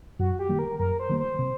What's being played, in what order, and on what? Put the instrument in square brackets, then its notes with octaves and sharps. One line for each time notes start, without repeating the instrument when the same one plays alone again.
[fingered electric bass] F#2 [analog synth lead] F#4
[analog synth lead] G4
[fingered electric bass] D#3 G3 A#3
[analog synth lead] A#4
[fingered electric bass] F#2 [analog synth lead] A#4
[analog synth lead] C5
[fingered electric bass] D#3 G3 A#3
[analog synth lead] C5
[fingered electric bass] C3